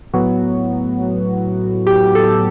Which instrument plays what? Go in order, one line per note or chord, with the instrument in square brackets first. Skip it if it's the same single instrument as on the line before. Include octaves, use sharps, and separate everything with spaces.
[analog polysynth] A2 F#3 B3 F#4
G4
A4